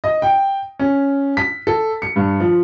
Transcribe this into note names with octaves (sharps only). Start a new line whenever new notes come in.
D#5
G5
C#4
B6
A4
C#7
G2
F3